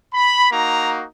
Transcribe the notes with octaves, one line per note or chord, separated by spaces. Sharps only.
B5
A#3 D#4 F#4 A#5